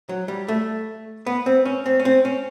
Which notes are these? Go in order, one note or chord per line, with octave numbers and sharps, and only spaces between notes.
F#3
G3
A3
B3
C4
C#4
C4
C#4
C4
C#4